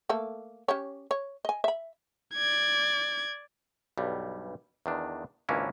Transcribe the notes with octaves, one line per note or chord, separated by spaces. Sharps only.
A3 A#3 A4
C#4 G4 C#5
C#5
D#5 G#5
E5 B5
D5 G#6
B1 G2 G3
E2 D#3 D4
G#1 C#2 A#3 C#4 D4 E4